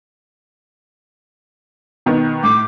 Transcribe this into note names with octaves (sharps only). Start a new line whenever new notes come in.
B2 D#3 B3
A2 D6